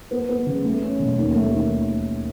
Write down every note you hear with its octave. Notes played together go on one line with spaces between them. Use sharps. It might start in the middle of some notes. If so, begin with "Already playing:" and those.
B3
B3
C#3
A3
C#4
B2
D#2
A3
D#3